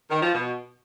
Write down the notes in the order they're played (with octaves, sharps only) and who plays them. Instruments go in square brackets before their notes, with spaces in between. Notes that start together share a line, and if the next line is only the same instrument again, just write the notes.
[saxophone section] D#3
F3
B2